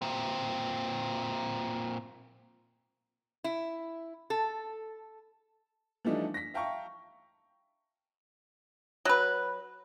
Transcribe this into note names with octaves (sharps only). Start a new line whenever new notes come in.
A#2 C4
E4
A4
E3 F3 G3 A3 D4 D#4
A#6 B6
E5 F5 G5 A5 A#5 C#6
F#3 B4